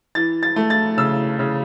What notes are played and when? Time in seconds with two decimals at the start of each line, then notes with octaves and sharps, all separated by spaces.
0.15 E3 A6
0.43 A6
0.56 A3
0.70 A6
0.98 C#3 E6
1.39 C#3